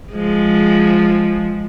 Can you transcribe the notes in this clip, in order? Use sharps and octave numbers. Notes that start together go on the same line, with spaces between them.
F3 G#3